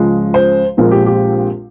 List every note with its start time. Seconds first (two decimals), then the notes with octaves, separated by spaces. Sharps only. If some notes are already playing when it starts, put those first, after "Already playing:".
Already playing: C#2 C#3 F3 G#3 C#4
0.34 C5
0.77 A#1 A#2 G#3 C4 A#4
0.91 G4
1.06 G4